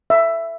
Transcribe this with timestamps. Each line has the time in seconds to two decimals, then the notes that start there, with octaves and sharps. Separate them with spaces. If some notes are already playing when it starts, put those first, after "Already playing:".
0.10 E5